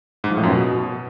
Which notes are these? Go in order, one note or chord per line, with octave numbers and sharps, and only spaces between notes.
G#2
F3
A2
F#2
B2